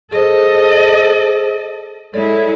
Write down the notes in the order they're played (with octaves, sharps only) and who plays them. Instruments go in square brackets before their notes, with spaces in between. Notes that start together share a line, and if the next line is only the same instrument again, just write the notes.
[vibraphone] G#4 C5 [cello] A4 D#5
[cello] G#3 E4 [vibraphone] A4 C#5 D5